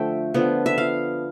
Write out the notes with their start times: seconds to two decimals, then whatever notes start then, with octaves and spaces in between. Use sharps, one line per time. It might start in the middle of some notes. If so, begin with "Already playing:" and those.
Already playing: D3 F3 A3 E5 G5
0.34 D3 F3 B3
0.66 E5
0.78 F5